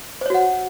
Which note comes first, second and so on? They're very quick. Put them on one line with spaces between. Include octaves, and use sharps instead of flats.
C5 C#5 F#4 F#5